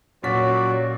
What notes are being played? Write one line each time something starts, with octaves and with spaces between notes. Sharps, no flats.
A#2 F#3 C#4 F#4 D5 B6